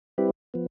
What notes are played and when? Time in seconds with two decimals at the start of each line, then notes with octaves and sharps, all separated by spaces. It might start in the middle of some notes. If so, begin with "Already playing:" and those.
0.18 G3 C4 E4 G4 B4
0.54 F3 B3